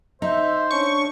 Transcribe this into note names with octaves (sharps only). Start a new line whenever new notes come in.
D#4 C5 E5
C#4 D4 C#6